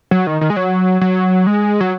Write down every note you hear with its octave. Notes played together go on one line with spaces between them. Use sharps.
F#3
D#3
D#3
G#3
F#3
F#3
G#3
F#3